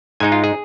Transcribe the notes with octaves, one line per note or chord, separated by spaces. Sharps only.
G#2 G#3 D#4 G#5
F4
G#4